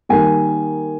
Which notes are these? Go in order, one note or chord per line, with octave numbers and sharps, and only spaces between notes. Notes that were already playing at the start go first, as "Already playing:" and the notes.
D#3 G3 A#3 G#5